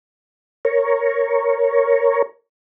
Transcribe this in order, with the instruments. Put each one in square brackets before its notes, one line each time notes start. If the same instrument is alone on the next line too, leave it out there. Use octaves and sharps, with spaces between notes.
[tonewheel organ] A#4 C#5